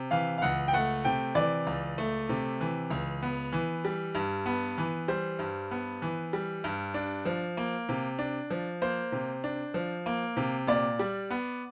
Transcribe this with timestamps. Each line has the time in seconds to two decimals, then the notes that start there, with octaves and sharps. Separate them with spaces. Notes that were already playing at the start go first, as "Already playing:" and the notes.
Already playing: C3
0.11 E3 F5
0.38 F5
0.42 C#2 F#5
0.68 G5
0.73 A3 F#5
1.05 C3 G5
1.35 E3 D5
1.67 C#2
1.98 A3
2.29 C3
2.61 E3
2.90 C#2
3.22 B3
3.53 E3
3.85 G3
4.15 G2
4.46 B3
4.78 E3
5.08 G3 C5
5.39 G2
5.71 B3
6.02 E3
6.33 G3
6.64 G2
6.94 D4
7.25 F3
7.57 A#3
7.89 C3
8.19 D4
8.50 F3
8.82 A#3 C5
9.12 C3
9.44 D4
9.74 F3
10.06 A#3
10.37 C3
10.67 A#2 D5
10.99 G3
11.30 B3